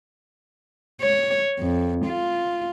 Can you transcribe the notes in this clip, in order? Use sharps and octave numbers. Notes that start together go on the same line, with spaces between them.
C#5
F2
F4